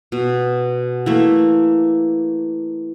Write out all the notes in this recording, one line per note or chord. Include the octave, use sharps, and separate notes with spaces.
B2
E3 A3 A#3